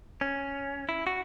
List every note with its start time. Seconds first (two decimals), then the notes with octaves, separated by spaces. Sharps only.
0.21 C#4
0.89 E4
1.07 F#4